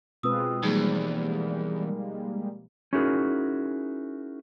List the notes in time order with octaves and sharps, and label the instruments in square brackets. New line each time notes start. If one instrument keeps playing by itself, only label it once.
[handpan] B2 C4 B4 [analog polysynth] G#3 F4 [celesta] D#6 E6
[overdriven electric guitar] E2 [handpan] F3 [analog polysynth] G3 G#3 A#3 [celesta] D#4 G#4
[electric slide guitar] C#4 D#4 E4 F#4 G#4 A#4